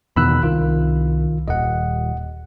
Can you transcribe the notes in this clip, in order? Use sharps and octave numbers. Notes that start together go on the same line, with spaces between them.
E2 B2 D#3 B5 E6 F#6
C2 D#3 F4
D#1 D#5 F#5